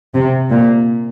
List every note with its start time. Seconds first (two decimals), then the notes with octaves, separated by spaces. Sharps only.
0.15 C3
0.50 A#2